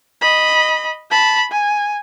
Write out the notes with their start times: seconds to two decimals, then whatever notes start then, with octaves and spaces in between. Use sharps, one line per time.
0.21 D#5 B5
1.11 A5 B5
1.51 G#5